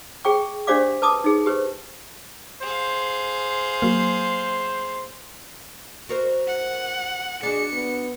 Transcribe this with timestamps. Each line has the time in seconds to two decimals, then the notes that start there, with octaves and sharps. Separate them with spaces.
0.25 G#4 G5 C#6
0.67 D4 G4 C5 D5 F5 D6
1.02 B4 A5 D6 D#6
1.24 D#4 G#4
1.46 G4 B4 C5
2.62 G#4 C5 F5
3.82 F#3 A#3
6.09 F#4 A#4 C5
6.47 F#5
7.43 D4 F#4 G#4 C#7
7.72 B3